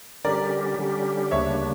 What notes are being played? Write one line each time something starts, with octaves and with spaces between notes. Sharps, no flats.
D3 G3 C#4 G4 A#4 D5
D3 G3 C#4 G4
D2 C#3 G3 A#3 D4 C#5 E5